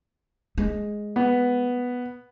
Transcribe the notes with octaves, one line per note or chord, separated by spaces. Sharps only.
G#3
B3